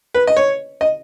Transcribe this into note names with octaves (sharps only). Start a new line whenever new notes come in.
B4
D#5
C#5
D#5